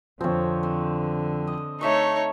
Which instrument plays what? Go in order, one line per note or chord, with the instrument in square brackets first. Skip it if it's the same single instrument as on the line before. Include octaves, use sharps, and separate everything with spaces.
[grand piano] F2 F3 [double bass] D3 [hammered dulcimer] C4 C#5
[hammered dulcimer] C4
D#5
[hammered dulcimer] A3 E5 C#6 [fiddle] D#4 C#5